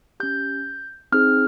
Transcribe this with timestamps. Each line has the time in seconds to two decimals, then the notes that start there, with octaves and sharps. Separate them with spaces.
0.20 C#4 G4 G6
1.12 C4 D#4 G#4 F6